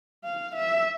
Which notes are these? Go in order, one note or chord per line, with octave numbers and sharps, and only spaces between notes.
F5
E5